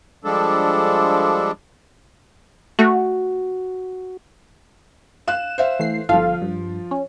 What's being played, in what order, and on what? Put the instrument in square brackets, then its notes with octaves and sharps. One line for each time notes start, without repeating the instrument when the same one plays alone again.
[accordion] F3 G3 G#3 D4 A4
[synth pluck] A3 [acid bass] F#4
[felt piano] F5 F#6 [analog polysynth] E7
[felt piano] C5 E5 F5
[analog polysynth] E3 A3 C7
[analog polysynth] G1 A4 F5 [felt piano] F3 F4
[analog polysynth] G2
C#4